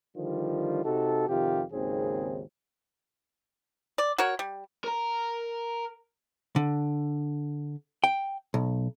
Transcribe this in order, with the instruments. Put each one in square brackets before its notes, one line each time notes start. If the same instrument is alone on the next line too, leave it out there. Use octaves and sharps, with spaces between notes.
[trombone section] D3 D#3 F3 G3 F4
C3 D#4 F#4 A4
F2 C3 D#3 F4 G4
G#1 D#2 C#3 C4 G#4
[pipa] D5
F#4 A#4 C#5
G3
[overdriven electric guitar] A#4 A#5
[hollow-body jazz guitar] D3
G5
B1